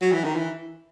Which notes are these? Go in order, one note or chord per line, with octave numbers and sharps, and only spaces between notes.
F#3
E3
D#3
E3